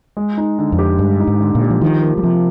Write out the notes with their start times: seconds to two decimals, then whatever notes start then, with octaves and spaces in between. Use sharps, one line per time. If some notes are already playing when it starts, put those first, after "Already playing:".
0.17 G#3
0.38 D#4
0.59 D3
0.72 F2
0.79 G4
0.99 G2 G#3
1.20 D#4
1.27 G#2
1.41 D3
1.55 A#2
1.61 G4
1.70 F3
1.81 D#3 F3
2.03 A#3
2.18 G3
2.23 C3 F3